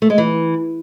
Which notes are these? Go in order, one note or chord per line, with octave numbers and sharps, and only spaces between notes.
A3
G#3
E3